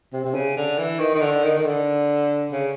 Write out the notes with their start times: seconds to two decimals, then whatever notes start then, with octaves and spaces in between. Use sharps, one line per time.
0.13 C3
0.24 C3
0.34 C#3
0.57 D3
0.78 E3
0.99 D#3
1.15 D#3
1.21 D3
1.43 D#3
1.58 D#3
1.65 D3
2.52 C#3